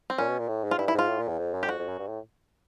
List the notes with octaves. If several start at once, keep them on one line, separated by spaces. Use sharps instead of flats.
C4
A#2 C#4
B2
A#2
A2
G#2
F4
G2 E4
E4
G#2 F4
A2
A#2
E2
F2
F#2
G4
F2 F#4
F2
F#2
G2
A2